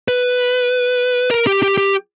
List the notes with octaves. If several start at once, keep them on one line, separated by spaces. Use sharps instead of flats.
B4
A#4
G4
G4
G4